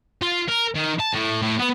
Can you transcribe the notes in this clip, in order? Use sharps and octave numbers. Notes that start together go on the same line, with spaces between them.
F4
A#4
D#3
A5
A2
A2
B3